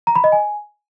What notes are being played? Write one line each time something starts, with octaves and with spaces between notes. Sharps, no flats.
A#5
B5
D#5
G#5